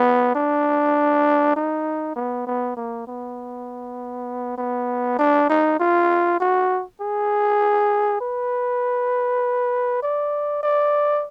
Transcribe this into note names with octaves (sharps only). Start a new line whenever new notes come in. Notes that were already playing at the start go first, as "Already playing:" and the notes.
Already playing: B3
D4
D#4
B3
B3
A#3
B3
B3
D4
D#4
F4
F#4
G#4
B4
D5
D5